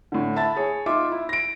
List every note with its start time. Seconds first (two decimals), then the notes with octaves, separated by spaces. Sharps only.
0.12 A2 D3
0.36 E5 A5 B5 A6
0.56 G#4 C#5
0.86 D#4 F4 E5 D6
1.11 E4
1.29 A#6 D7